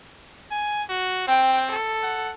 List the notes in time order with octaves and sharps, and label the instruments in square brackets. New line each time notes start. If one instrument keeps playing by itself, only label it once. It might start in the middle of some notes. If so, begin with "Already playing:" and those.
[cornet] G#5
F#4
[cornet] C4 [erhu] G5
[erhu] A4
[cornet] F#5